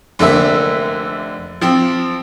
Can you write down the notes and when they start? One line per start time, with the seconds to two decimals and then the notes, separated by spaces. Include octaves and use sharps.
0.19 F1 D3 A#3 E5
1.61 F3 C4